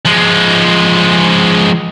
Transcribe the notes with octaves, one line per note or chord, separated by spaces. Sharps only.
F3 G#3